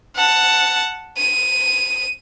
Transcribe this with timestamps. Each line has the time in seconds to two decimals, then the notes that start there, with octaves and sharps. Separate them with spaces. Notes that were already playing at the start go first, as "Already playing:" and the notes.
0.16 F#5 A5
1.18 D#7